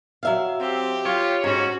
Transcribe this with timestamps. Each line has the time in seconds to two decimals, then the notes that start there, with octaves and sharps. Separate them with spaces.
0.23 F#3 E5 F5
0.60 C4 G4
1.06 F4 C#5
1.44 G#2 C#4 F#4